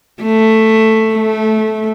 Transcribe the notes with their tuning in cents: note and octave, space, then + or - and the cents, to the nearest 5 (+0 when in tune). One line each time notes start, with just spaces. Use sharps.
A3 +5
A3 -15